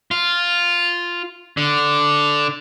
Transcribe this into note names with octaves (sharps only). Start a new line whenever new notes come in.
F4
D3